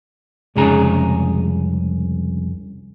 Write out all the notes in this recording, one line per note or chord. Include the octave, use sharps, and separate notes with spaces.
C2 F2 C#3 G#3 G#4 A#5